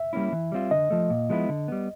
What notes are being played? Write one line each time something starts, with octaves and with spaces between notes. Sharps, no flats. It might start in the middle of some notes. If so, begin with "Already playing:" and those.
Already playing: E5
G3 A#3 C#4 E4
E3
G3 C4 F4
D3 D#5
F3 A3
A#2
F3 G#3 B3 E4
D3
G3 B3